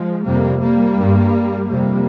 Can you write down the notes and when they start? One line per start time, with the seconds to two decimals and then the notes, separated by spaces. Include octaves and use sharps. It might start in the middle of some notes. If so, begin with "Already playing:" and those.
Already playing: F3 G#3
0.24 F2 C3 G3 A#3
0.61 G3 A#3
0.97 G2
1.69 F2 C3 G3 A#3